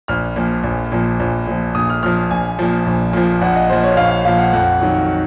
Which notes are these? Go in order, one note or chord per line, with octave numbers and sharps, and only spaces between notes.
A#1 F6
A#2 F3
A#1
A#2 F3
A#1
A#2 F3
A#1 D#6
F6
A#2 F3 F6
A#1 G#5
A#2 F3
A#1
A#2 F3
A#1 F#5
D#5
A#2 F3 C5
C#5
A#1 F5
F5
A#2 F3 F5
F#5
F2 F#5
D#3 F#3